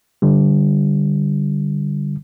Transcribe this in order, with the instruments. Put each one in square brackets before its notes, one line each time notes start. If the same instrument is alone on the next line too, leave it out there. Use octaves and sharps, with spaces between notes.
[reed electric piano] D3 G3